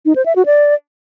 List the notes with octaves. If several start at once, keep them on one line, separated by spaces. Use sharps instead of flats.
D#4
C5
E5
F#4
D5